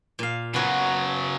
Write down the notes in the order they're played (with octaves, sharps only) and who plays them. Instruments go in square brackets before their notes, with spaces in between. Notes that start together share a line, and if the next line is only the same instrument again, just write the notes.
[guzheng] A#2 F5
[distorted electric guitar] C#3 F#3 [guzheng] B3 F#4